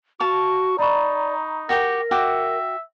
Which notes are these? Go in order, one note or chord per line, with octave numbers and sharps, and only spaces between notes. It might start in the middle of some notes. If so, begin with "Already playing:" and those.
F#4 F5 A5 C#6
D#4 D5 A#5 B5 C#6
F#4 G4 A#4 G5 A#6
F#4 E5 G5 D6